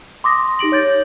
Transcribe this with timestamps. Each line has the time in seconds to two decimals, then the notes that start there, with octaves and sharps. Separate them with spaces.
0.24 C6 D6 D#6 A#6
0.59 D#4 G4 A#6 D7 F#7
0.72 C#5 G6 A6